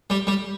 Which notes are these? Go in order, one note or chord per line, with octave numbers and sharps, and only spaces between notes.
G3
G3